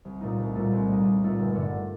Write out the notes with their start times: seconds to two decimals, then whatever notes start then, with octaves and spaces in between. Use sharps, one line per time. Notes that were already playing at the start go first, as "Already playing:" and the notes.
0.05 C2
0.21 A#2 A3 D#4
0.38 C2
0.55 A#2 A3 D#4
0.72 C2
0.89 A#2 A3 D#4
1.05 C2
1.22 A#2 A3 D#4
1.39 G1
1.55 G2 D3 A3